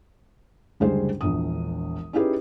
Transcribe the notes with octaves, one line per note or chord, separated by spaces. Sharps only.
F#1 D2 G3 G#3 G#4 C5
E1 A#1 D#6
C#4 D#4 E4 G4 G#4 B4